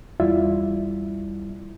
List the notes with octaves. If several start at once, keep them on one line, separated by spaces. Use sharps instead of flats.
E2 G3 E4 F4 D5 E5